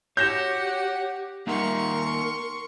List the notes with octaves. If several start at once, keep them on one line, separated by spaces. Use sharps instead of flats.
F#4 G4 C#5 F#5 G6 A#6 E7
A#3 D#4 A#4 F#5 C6 C#6